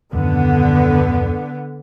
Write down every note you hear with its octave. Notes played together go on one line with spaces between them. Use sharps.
D#1 F#2 D3 B3